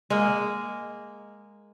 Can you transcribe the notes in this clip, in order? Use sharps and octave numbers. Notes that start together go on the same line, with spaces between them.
G#3 A#3